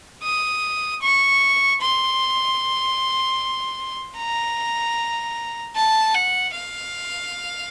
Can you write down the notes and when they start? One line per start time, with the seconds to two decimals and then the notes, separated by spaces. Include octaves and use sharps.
0.24 D#6
1.02 C#6
1.81 C6
4.18 A#5
5.76 A5
6.15 F#5
6.54 F5